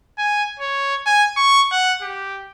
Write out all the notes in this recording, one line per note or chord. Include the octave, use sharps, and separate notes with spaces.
G#5
C#5
G#5
C#6
F#5
G4